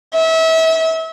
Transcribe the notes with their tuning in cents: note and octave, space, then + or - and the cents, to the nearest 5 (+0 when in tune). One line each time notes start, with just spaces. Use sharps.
E5 -30